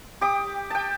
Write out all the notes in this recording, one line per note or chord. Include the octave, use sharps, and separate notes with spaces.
G4 D6 D#6
G5 A5